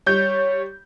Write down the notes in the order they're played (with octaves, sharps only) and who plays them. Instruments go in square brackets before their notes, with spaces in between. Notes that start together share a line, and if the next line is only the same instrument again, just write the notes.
[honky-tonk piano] G3 G6 [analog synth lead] C#5